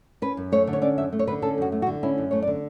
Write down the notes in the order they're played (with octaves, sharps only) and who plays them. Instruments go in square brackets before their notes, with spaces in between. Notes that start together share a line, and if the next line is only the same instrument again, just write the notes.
[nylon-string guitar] C#4 B4
F#2
A3 C#5
D3
C#5
C#4 D5
F#2 E5
A3
C#5
D3 B4
C#4 A4
F#2 F#4
A3
F#4
D3
C#4 E4
F#2
A3 C#5
D5
D3